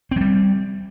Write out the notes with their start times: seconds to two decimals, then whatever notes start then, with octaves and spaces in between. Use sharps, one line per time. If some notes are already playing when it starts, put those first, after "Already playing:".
0.11 C4
0.16 F#3
0.21 G3